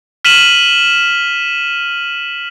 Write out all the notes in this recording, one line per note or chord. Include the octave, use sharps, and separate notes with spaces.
F6 B6 D#7 E7 F#7